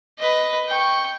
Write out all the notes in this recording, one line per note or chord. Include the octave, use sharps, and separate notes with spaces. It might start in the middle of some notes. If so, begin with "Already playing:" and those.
B4 D#5
G5 C#6